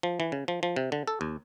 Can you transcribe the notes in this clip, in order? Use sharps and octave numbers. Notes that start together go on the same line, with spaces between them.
F3
E3
C#3
F3
F3
C3
D3
A4
D#2